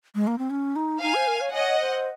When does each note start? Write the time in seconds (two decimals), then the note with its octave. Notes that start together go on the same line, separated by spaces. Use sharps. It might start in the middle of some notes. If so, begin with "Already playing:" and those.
0.15 G#3
0.27 A#3
0.38 C4
0.50 C#4
0.76 D#4
1.02 D#4 F5 G#5
1.15 C5
1.27 A#4
1.41 C#5
1.53 C#5 D#5 F#5
1.80 C5